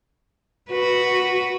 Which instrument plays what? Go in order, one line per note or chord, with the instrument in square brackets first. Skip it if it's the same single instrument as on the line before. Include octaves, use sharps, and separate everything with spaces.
[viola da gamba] F#4 B4